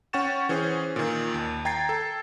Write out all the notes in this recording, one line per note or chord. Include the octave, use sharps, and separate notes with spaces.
C#4 F#5 G5 C#6 A6 E7
E3 C#4 G#4 C5
A#2 D#3
D#2
G5 A#5 G#6 A6 C7
A4